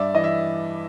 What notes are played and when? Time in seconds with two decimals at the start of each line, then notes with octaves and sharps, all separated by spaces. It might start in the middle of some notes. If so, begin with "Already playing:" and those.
Already playing: G2 D5 E5
0.14 E3 D#5
0.24 E5